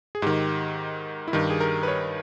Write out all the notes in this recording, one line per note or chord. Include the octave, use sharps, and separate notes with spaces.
G#4
G#2 D#3 G4
E4
G2 D#3 G4
G#4
A#4
B4
C#5